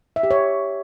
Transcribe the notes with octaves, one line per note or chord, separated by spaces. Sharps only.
E5
G4
C#5